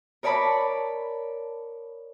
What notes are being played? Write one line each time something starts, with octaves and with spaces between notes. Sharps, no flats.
A#4 C#5 D5 A5 B5